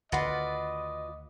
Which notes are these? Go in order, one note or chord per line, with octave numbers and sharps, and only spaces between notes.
D2 D3 D#3 F4 F#4 B4 D5 D#5